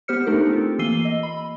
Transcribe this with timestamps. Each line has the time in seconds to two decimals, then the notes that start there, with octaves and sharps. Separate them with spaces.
0.08 B3 G4 C5 F6 C#7
0.27 A3 D4 D#4 G4 A4 A#4
0.49 C4 F4
0.79 E3 A#3 E6 C7 D#7 G7
1.05 D#5
1.23 B5